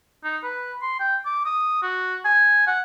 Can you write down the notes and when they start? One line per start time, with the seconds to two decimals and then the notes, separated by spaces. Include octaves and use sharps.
0.24 D#4
0.44 B4
0.82 C6
1.00 G5
1.26 D6
1.45 D#6
1.83 F#4
2.25 G#5
2.67 F#5